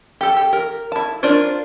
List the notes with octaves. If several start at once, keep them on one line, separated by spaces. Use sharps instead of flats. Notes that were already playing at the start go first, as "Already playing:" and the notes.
G4 A4
G4
A#4
E4 A5
D4 F4 A#4 C5